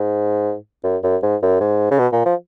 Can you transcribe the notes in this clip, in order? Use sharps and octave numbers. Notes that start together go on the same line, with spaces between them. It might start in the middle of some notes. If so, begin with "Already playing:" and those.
Already playing: G#2
F#2
F#2
G#2
F#2
G#2
C#3
B2
A#2
F3